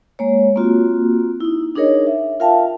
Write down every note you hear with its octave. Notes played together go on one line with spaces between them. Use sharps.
G#3 A#3 C#5
A#3 C4 F4 F#4
D#4 E4
D4 D#4 G#4 A#4 C#5 D#5
E5
F4 A#4 E5 F5 G5 A5